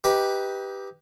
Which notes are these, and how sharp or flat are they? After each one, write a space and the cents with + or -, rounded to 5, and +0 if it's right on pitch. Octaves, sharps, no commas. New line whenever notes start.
D#4 +25 G4 +0 B4 +0